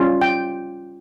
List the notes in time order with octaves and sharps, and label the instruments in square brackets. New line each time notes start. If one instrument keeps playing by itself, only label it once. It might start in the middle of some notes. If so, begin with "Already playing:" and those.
Already playing: [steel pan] G3 C#4 F4
G5